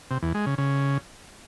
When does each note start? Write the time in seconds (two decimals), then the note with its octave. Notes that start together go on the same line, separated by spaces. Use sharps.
0.11 C3
0.22 E2
0.34 G#3
0.46 C#3
0.58 C#3